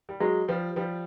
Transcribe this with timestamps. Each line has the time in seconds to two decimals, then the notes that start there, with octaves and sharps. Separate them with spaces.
0.09 G3
0.20 F#3 G#3
0.48 F3 G3
0.76 F3 G3